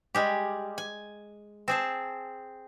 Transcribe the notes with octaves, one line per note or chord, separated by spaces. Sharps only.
G3 G#3 G4
G#5
C4 G#4 A5